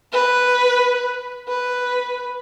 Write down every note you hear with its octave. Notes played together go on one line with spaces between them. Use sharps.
B4
B4